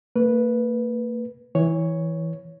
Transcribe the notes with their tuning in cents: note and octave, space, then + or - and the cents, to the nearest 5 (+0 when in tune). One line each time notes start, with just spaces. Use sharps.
A#3 -45 B4 -10
E3 -15 C#5 +0